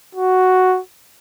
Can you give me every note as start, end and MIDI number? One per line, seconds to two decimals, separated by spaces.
0.15 0.79 66